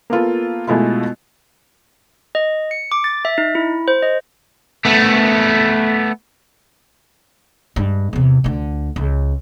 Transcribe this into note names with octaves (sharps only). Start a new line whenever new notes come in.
A#3 B3 F4 A4
B2 G#3 A3 E4 F4
D#5
C#7
D6
A6
E5
D#4
E4
C5
D#5
A3 B3
G2 G#3
E2 C3
D2 D3
C#2